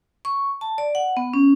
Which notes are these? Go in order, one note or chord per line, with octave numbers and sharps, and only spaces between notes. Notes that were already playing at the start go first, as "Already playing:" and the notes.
C#6
A5
D5
F#5
B3
C#4